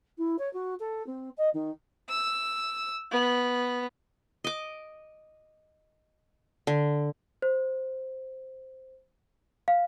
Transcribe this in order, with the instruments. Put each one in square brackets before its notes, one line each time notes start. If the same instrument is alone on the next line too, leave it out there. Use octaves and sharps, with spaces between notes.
[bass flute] E4
C#5
F#4
A4
C4
D#5
D#3
[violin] E6
B3
[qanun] D#5 D6
D3
[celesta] C5
F5